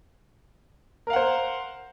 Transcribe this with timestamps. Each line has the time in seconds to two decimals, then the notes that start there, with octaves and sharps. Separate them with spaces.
1.07 A#4
1.10 F5
1.13 F#5
1.16 C5